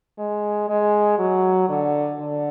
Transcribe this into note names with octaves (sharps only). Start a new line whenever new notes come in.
G#3
G#3
F#3
D3
D3